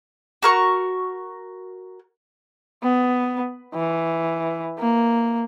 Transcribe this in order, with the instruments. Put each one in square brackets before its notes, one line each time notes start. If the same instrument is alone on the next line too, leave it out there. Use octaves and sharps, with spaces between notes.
[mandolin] F#4 A#4 C#6
[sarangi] B3
E3
A#3